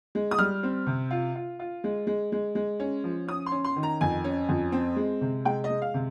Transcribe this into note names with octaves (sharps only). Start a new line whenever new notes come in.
G#3
D#6
G3 F6
C4
C3
F4
F4
F4
G#3
G#3
G#3
G#3
C#4
F3
C#4 D#6
C6
C#4
C6
D#3
A#5
F2 G#5
C#4
F2
C4
G#3
C3
G#3 G5
D#5
G#3
F5
C3